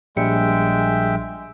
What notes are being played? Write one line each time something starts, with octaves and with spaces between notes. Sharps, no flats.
A#1 G3 G#3 E5 G5 C#7